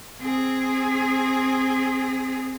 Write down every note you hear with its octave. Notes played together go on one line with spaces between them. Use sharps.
C4 G#4